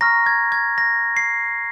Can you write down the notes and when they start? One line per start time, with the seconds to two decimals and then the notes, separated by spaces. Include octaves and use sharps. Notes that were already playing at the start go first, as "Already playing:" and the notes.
0.01 A#5 C#6 F6 A#6
0.26 G#6
0.52 G#6
0.78 A#6
1.17 C7